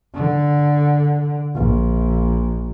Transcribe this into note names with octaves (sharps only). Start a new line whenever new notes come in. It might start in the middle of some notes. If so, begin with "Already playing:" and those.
D3
A#1